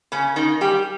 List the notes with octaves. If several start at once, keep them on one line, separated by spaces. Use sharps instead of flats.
C#3 C#4
D#3 D#4
G3 G4